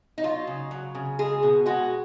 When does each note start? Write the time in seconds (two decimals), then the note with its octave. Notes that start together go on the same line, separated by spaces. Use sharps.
0.18 D#4
0.23 F#3 F4
0.47 C#3
0.71 F#3
0.95 C#3
1.19 G#3 G#4
1.43 B2
1.66 G#3 F#4